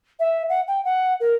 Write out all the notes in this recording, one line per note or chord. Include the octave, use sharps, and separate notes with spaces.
E5
F#5
G5
F#5
A#4